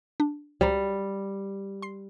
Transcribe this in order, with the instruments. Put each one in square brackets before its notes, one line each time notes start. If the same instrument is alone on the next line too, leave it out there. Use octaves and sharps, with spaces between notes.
[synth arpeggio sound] D4
[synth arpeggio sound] C#2 C5 A#5 [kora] G3
[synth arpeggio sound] C6 C7